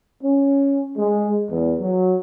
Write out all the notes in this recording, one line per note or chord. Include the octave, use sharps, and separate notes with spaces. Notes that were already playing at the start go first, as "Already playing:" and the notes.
C#4
G#3
E2
F#3